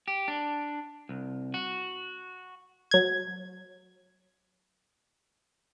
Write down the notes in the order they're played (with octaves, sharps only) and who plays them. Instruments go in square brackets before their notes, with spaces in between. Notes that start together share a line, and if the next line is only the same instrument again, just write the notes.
[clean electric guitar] G4
D4
C2
F#4
[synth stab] F#3 G#6